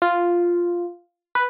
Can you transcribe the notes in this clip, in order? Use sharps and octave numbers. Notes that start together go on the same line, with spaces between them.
F4
B4